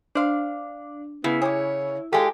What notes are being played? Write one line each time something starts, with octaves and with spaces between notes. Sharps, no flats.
D4 C5 F5
C#3 B3 E4
G4 G#4 C#5
G#3 F4 G4 A4 G#5